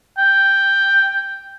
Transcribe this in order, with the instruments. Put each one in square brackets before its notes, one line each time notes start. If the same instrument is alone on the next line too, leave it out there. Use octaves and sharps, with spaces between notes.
[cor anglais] G5